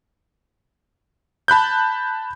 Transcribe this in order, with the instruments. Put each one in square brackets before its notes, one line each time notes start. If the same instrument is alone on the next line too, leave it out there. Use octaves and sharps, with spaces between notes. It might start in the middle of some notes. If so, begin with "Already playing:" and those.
[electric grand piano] A5 B5 F#6 G6